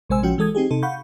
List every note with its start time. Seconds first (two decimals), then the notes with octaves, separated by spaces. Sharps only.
0.09 A#1 C3 G#3 C5 G#5 E6
0.22 A#1 F3 C#4 F#4 G5
0.38 E3 G#3 A4 D#6 G#6
0.55 C4 D#4 G4 G#4
0.71 C3 D#4 A4
0.83 F5 F#5 B5 C#6 G6